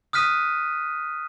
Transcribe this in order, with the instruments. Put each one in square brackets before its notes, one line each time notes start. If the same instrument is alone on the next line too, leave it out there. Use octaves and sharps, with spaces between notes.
[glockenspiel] D#6 F6 F#6 B6 D#7